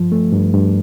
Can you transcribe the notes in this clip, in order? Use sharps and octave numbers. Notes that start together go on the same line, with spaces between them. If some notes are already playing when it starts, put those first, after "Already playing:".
Already playing: G2 F3
A3
G2
G2